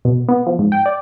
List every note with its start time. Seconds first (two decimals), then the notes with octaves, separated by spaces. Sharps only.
0.05 B2
0.29 B3
0.47 F3
0.59 G#2
0.72 G5
0.86 D5